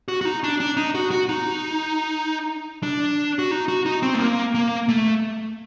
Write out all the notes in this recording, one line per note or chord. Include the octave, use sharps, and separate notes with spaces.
F#4
F#4
D#4
D4
D4
D#4
F#4
F#4
D#4
D4
F#4
D#4
F#4
D#4
C4
A3
A#3
A#3
A3